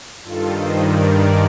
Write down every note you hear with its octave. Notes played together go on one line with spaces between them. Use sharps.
G2 D#3 F4 A4
C5 D#5
A#4 D5
A#4 D5